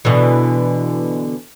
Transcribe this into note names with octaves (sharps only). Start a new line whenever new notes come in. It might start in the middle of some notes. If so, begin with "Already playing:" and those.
B2 D3 E3